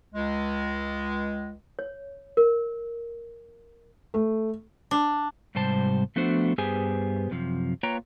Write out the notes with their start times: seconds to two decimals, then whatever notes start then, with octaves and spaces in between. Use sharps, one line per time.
0.14 C#2 G#3
1.79 C#5
2.37 A#4
4.14 A3
4.91 D4
5.55 G#2 C3 G3 C5 A5
6.16 F3 A3 B3 D4 F#4 C5
6.58 G2 B3 G4 G#4 C5 G#5
7.31 F#2 C3 F3
7.83 A#3 F4 B4 C#5 G5 A#5